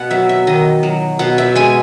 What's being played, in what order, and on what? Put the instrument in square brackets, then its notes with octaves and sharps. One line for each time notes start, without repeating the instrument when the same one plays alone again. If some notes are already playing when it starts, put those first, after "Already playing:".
Already playing: [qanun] B2 F#5
F#3 E5
E5
D#3 D#5
F#3
B2 F#5
E5
G#3 G#5